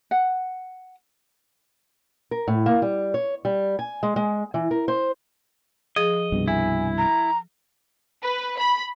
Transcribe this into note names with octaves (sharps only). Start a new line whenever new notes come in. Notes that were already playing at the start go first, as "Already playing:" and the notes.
F#5
A#4
A2
A#3
G3
C#5
G3
G#5
G#3
G#3
E3
A#4
C5
F3 G#4 D#5
C2 G2 B2
E4 E5 G#5
A#5
B4
B5